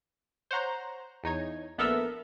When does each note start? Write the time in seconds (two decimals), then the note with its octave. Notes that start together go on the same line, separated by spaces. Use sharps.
0.51 C5 C#5 F#5 A#5
1.24 E2 D#4 C#5 G#6
1.78 A#1 B3 A4 A#4 E5 B6